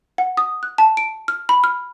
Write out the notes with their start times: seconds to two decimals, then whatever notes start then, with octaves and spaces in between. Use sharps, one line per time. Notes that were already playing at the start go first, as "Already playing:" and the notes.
0.18 F#5
0.37 D#6
0.63 F#6
0.78 A5
0.97 D7
1.28 F6
1.49 B5
1.64 F6